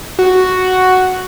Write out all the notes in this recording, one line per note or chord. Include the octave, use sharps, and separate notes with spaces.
F#4